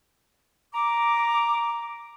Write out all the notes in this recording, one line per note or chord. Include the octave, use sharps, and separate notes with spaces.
A#5 D6